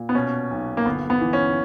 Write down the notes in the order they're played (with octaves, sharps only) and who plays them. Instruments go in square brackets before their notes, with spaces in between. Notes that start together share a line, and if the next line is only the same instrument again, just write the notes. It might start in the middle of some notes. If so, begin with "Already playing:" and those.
Already playing: [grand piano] A#2
B3
B2 C#4
B1
A#3
G1 B3
B3
E3
C#4